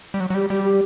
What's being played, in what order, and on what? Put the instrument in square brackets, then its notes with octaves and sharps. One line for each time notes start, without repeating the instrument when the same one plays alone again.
[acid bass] G3
F#3
F#3
[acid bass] G3 [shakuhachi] G4
[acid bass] G3 [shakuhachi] G4
[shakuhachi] G4